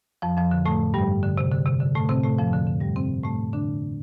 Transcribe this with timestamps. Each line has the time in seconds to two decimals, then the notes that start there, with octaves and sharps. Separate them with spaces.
0.22 F2 F3
0.37 F2 F3
0.51 D3
0.66 A2 A3
0.94 G2 G3
1.23 D3
1.38 C3
1.52 D3
1.66 C3
1.80 D3
1.95 A2 A3
2.09 C3 C4
2.23 A2 A3
2.38 F2 F3
2.53 D3
2.67 D3
2.81 G2 G3
2.96 C3 C4
3.24 A2 A3
3.53 D3 D4